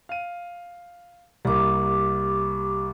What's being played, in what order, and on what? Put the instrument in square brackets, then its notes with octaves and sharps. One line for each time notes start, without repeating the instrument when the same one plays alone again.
[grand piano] F5 D#7
[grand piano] C2 A#3 [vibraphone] G4 D6